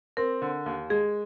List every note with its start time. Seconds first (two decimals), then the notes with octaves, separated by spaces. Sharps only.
0.17 C4 A#4
0.42 D3
0.66 D#2
0.90 G#3 G#4